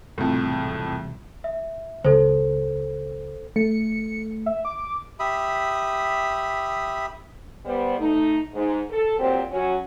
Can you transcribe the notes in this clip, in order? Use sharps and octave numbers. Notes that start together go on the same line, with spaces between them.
E1 C2 F2 A2
E5
C#2 A4 C5
A3 C#7
E5
D6
G4 E5 B5 D#6
G3 B3 C5
A3 D#4
G#2
A4
A#2 F#3 C4 G4 C5
F#3 C#4 F#4